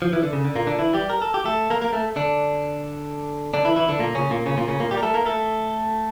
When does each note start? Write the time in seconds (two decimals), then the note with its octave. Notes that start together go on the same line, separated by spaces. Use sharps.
0.02 F3
0.13 E3
0.23 D3
0.33 C#3
0.45 D3
0.56 A#2 A#3
0.67 D3 D4
0.79 E3 E4
0.93 G3 G4
1.10 A#4
1.22 A4
1.34 G4
1.45 A3 A4
1.70 A#3 A#4
1.81 A#3 A#4
1.93 A3 A4
2.16 D3 D4
3.54 D3 D4
3.65 E3 E4
3.76 E3 E4
3.89 D3 D4
4.00 A#2 A#3
4.15 C#3 C#4
4.30 A#2 A#3
4.46 C#3 C#4
4.57 A#2 A#3
4.68 C#3 C#4
4.80 A#2 A#3
4.91 G3 G4
4.97 A#4
5.02 A3 A4
5.14 A#3 A#4
5.25 A3 A4